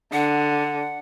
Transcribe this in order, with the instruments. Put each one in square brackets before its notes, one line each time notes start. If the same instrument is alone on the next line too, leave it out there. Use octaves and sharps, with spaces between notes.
[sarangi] D3 [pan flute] F#5